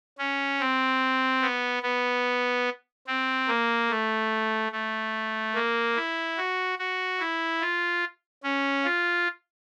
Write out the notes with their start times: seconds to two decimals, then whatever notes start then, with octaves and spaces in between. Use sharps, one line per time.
0.19 C#4
0.60 C4
1.42 B3
1.83 B3
3.07 C4
3.48 A#3
3.90 A3
4.72 A3
5.54 A#3
5.96 E4
6.37 F#4
6.78 F#4
7.19 E4
7.61 F4
8.44 C#4
8.84 F4